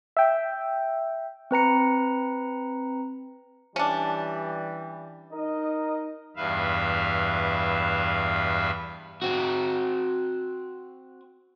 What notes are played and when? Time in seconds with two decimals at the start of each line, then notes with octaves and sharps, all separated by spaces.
0.17 E5 G5
1.51 C4 B4 A#5 C#7
3.76 E3 G3 C#4 D4
5.33 D#4 A#4 D#5
6.36 E2 G2 B4 E5 F5
9.22 C4 F#4